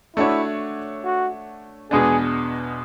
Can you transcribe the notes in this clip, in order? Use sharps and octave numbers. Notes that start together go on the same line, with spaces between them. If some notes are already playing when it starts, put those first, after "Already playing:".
A3 D4 E4 F#4 C#5
F#4
E2 B2 G#3 B3 D4 G#4